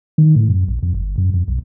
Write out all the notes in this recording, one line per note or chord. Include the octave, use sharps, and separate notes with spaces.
D#3
A2
F#2
A#1
F2
G1
F#2
F2
B1